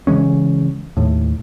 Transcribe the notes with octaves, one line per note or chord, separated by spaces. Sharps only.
C#3 E3 G#3 C#4
D#2 A2